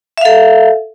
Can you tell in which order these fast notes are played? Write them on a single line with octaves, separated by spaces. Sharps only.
E5 F5 A4